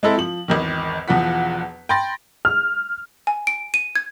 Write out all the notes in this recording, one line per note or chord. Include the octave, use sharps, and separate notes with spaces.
G#3 C4 E4 A4
F3 F#7
G#1 E2 D#3
E1 E2 F3 F#5 B6
G5 B5 C6 A6 A#6
F6
G#5
D7
D#7
G#6